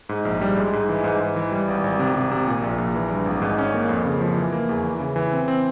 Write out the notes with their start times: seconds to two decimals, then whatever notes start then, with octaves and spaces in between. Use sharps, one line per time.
0.09 G#2
0.25 A#1
0.41 G3
0.57 G#3
0.73 G#2
0.89 E3
1.04 G#2
1.20 G#2
1.36 E3
1.52 G3
1.68 G#1
1.84 G#1
1.99 C3
2.15 C3
2.31 C3
2.47 A#2
2.62 A#1
2.78 A#1
2.94 E3
3.10 G2
3.26 G#1
3.42 G#2
3.58 C#4
3.74 A#3
3.89 F2
4.05 C#3
4.21 F3
4.37 E3
4.52 A#3
4.69 E2
4.84 E3
5.00 C#3
5.16 E3
5.32 C4
5.48 C4